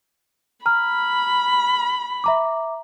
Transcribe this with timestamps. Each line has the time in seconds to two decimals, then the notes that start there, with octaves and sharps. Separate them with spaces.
0.66 A#5 B5 F6
2.24 E5 A#5 D6